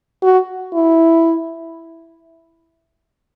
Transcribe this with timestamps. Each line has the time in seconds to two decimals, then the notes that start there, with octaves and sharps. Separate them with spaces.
0.23 F#4
0.73 E4